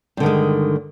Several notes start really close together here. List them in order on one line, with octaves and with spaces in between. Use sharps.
G2 D3 D#3 G#3